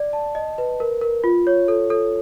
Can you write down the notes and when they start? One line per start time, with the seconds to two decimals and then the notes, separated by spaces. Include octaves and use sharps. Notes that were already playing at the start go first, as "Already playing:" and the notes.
Already playing: D5
0.13 A5
0.35 D#5
0.58 B4
0.80 A#4
1.01 A#4
1.24 F4
1.47 C#5
1.68 A4
1.90 A4